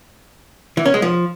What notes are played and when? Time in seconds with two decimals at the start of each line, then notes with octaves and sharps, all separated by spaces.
0.77 E3
0.86 C#4
0.94 G#3
1.02 F3